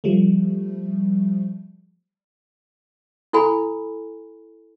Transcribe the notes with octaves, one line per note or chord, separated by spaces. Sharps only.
F3 G3 A3
E4 A4 G#5 B5